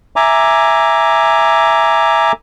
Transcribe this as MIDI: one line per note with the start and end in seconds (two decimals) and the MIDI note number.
0.16 2.32 76
0.16 2.32 80
0.16 2.32 82
0.16 2.32 86